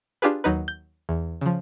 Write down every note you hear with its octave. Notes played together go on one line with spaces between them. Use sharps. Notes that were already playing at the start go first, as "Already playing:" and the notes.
D4 F4 G4 G#4 B4
D#2 F#3 D#4 B4
G6
E2
C#3 F3